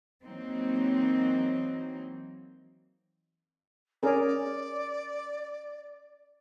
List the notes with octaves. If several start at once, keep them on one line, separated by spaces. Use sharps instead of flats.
E3 F#3 A#3 C4 D#4
C#4 G#4 A#4 D5